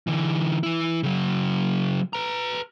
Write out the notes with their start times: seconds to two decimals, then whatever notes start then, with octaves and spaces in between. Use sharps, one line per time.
0.07 D3 E3
0.63 E3 E4
1.03 C#3 F#3
2.13 B4 A#5